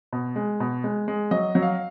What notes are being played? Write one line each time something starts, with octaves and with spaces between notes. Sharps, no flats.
B2
G#3
B2
G#3
G#3
F#3 D#5
F#3
F5